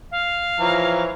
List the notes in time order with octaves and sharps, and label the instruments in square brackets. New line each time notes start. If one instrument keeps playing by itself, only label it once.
[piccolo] F5
[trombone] E3 [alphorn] F3 [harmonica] C#5 A#5